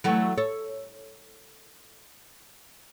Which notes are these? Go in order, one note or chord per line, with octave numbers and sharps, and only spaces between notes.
E3 F#3 A3
A4 C#5